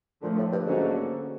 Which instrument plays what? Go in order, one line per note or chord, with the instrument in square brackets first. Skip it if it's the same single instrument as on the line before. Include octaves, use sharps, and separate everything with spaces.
[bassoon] A#2 [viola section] D3 F3 A3
[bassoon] A2
G2
[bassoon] G#2 [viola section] D3 F#3 A#3 C#4 F#4